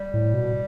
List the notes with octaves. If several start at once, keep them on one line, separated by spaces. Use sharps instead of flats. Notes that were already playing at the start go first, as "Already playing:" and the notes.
Already playing: G3
A2
B2